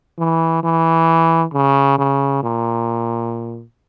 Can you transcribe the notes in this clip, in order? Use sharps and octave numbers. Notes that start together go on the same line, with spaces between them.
E3
E3
C#3
C#3
A#2